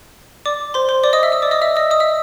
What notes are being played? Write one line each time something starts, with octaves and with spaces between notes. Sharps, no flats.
D5 D6
C5 C6
C5 C6
D5 D6
D#5 D#6
E5 E6
D#5 D#6
D5 D6
D#5 D#6
E5 E6
D#5 D#6
D#5 D#6
E5 E6